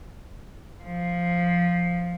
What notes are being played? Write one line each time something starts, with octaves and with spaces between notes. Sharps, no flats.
F3